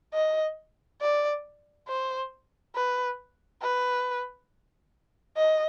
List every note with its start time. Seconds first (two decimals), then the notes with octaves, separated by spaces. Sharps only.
0.14 D#5
1.01 D5
1.88 C5
2.75 B4
3.62 B4
5.37 D#5